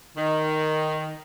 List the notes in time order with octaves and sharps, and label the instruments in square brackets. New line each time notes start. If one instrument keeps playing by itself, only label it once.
[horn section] D#3